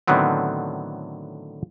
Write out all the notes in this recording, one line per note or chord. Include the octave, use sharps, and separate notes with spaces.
A2 D3 D#3 F#3 B3 C4